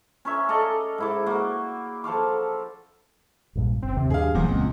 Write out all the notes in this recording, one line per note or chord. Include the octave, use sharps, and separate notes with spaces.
C#4 A#4 C#5 E5
A4 D5 D#5 F5
G#2 E4 D6
A#3 F#4
F3 A4 F5 D6
A#1 G2 A#2
F#1 C4
D#2 C3
G2 G#4 F5
D#1 E2 A#2 E3 F3 G3
C#2 G#3 C4 C#4